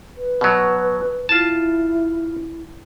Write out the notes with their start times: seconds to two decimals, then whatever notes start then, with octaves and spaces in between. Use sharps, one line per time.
0.17 B4
0.41 B2 F#3
1.29 E4 F4 A5